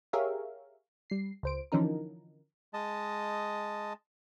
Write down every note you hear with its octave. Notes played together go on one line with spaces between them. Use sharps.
G4 G#4 A#4 C#5 E5 F5
G3 C7
C#2 C5 D7
D3 E3 F3 C#4 D#4 A#4
G#3 D#5 A5